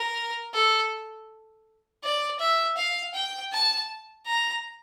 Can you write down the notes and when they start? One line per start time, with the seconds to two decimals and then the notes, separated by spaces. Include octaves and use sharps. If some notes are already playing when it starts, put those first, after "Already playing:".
Already playing: A#4
0.54 A4
2.03 D5
2.40 E5
2.77 F5
3.14 G5
3.52 A5
4.26 A#5